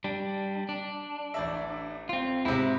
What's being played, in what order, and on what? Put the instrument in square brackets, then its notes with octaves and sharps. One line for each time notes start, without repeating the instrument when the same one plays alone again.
[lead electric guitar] G3 D4
D4
[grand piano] A1 D5 E5
[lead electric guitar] C4 F4
[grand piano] G#2 C3 [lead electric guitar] E4